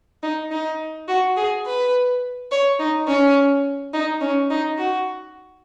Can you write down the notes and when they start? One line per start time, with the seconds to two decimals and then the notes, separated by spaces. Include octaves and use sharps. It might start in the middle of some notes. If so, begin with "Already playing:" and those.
0.23 D#4
0.51 D#4
1.08 F#4
1.37 G#4
1.66 B4
2.51 C#5
2.79 D#4
3.08 C#4
3.93 D#4
4.21 C#4
4.51 D#4
4.78 F#4